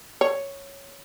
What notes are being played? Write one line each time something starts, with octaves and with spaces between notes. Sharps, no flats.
C#5